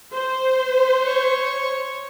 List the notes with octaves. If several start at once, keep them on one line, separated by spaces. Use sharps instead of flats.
C5
C#5